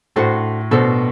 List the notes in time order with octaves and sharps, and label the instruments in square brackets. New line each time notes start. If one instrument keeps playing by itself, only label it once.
[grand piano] A2 [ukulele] D4 F#4 A4 C5
[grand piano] B2 [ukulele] D4 F#4 A4 C5